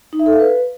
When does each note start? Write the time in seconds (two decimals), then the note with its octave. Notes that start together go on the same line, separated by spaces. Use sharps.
0.13 D#4
0.19 E5
0.26 A4
0.33 F5
0.40 B4